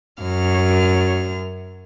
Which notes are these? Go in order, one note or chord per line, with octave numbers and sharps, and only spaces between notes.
F#2 F6